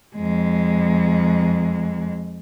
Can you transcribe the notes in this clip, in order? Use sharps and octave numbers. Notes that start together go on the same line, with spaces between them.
F2 G#3